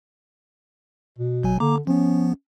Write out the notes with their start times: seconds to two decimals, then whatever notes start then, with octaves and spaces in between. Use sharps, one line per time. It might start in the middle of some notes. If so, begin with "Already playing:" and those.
1.19 B2
1.43 G1 F#3 G#5
1.60 D3 A#3 A#5 D6
1.87 F3 B3 C#4